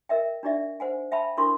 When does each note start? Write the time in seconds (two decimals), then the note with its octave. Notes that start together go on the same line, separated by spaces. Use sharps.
0.09 A#4 D#5 E5 G5
0.43 D4 D#4 G4 D5 E5
0.80 C5 F#5 G#5
1.12 E5 G5 A5 B5
1.37 D4 E4 A4 A#4 C6 C#6